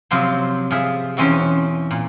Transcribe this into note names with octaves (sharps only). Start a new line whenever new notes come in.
C3 F3 F#3 C5
F3 G#4 E5
E2 B2 E3 C4 C#4 D#4
A#2